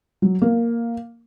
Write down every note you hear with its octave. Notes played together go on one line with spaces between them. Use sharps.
F#3
A#3